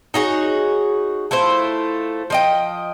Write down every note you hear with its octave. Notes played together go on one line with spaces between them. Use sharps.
D#4 F#4 G#4 C#5
A3 E4 F4 C5
F3 D#5 G5